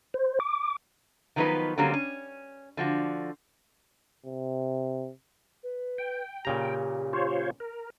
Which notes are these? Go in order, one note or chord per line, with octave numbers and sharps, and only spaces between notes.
C5
D6
D#3 F3 F#3 B3 D#4 B4
D3 F#3 G3 A#3 C4 C#4
C#4
D3 F3 F#4
C3
B4
G5
A#2 C#3 G4 A#5
F4 C5 C#5
A#4